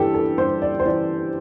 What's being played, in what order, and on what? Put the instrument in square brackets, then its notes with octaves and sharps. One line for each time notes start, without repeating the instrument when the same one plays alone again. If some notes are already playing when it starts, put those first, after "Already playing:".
Already playing: [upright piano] G2 E3 G4 A4
A4
G2 C5
D5
C5
E3 D5